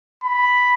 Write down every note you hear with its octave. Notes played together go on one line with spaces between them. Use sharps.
B5